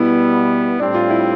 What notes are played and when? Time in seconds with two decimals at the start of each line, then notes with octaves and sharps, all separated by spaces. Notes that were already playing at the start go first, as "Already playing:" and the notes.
Already playing: B2 G3 B3 E4
0.80 A2 G3 C4 D4
0.94 F4
1.10 E4